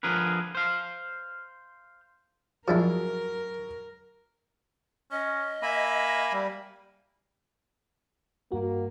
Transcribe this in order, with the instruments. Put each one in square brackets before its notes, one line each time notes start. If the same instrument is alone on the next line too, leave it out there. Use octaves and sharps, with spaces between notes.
[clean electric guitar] D3 F3 G#4 A#4 B4
C5 F5
[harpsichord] F3 D4 E4 [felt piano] F#3 G#4 [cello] A#4
[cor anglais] C#4 [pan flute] D#5
[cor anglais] A#3 [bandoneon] E5 G#5 B5
[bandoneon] G3
[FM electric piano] G2 F#4 [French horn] A#3